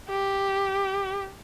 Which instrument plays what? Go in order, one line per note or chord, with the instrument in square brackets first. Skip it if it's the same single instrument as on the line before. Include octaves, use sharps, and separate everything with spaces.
[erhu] G4